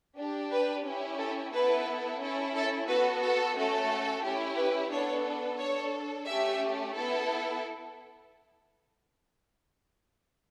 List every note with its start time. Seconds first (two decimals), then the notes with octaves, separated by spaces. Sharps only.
0.18 D4 G4
0.51 B4
0.85 C#4 E4 G4
1.19 A4
1.52 B3 E4 A4 B4
2.20 C#4 E4 A4
2.54 A4
2.88 B3 F#4 A4 B4
3.22 A4
3.55 A3 C#4 F#4 A4
4.23 C#4 E4 G4
4.57 B4
4.90 B3 D4 A4 C#5
5.58 D4 A4 C#5
6.26 A3 C#4 G4 E5
6.94 B3 E4 A4